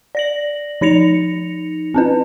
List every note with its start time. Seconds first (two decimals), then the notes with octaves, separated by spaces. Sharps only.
0.15 D5 A#6 F#7
0.81 F3 D#4 A#6 C#7 F7
1.94 C4 C#4 B4